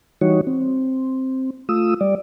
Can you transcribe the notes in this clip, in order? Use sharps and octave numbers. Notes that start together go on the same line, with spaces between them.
E3 G3 D#4 F#4 C#5
C4
A3 F4 D#6 E6
G3 D5